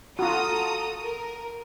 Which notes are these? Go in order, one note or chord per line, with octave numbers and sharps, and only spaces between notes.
F4 F#4 A4 A#5 D#6
A#4